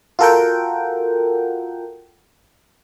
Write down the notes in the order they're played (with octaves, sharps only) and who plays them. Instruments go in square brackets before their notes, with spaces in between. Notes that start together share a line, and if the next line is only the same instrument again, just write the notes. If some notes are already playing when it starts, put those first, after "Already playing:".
[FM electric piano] F4 F#4 A4 A#4 F#5 G5